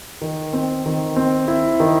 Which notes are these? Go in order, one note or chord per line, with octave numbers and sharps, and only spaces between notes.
D#3
C4
D#3
C4
E4
D#3